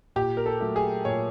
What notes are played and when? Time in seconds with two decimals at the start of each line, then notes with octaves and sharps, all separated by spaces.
0.16 A#2 G4
0.37 A#4
0.46 A4
0.61 F#3 A3
0.76 G#4
1.05 A#2 C#5